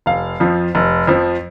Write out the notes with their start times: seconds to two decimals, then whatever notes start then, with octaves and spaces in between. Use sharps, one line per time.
0.06 F1 F5
0.40 F2 F3
0.75 F1
1.07 F2 F3